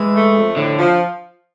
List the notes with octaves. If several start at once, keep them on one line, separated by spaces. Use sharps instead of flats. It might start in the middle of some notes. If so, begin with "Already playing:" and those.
Already playing: E3 G#3
A3
F2
A2 D3
F3